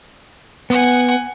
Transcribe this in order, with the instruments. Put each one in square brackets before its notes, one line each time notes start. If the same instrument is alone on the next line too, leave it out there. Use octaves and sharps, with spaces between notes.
[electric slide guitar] B3 [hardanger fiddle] F#5 G#5